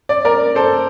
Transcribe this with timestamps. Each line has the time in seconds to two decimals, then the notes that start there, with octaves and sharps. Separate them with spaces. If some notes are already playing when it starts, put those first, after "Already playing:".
0.09 D5
0.25 A#4 D5
0.55 A4 C5